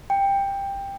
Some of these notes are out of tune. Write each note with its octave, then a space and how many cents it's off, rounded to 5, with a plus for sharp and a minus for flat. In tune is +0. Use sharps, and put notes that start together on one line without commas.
G5 +15